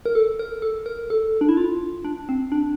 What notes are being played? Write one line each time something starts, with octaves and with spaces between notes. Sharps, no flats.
A#4
A4
A#4
A4
A#4
A4
D4
E4
F4
D4
C4
D4